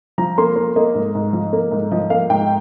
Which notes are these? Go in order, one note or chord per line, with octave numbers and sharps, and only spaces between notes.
F3 A#5
A#3 C6
A#3
A#3 D#5
G#2
G#2
F3
A#3
G#2
F3 D#5
A#3 F5
G#2 G5